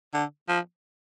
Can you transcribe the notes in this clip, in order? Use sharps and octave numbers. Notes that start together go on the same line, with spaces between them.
D3
F3